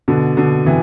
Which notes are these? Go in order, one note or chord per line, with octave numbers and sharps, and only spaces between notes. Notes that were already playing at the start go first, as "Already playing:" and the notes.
B2 D3
B2 D3
C3 E3